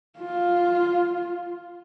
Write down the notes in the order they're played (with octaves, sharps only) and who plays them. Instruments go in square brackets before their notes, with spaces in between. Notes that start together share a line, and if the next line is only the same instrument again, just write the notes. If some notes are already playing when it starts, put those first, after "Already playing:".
[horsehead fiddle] F4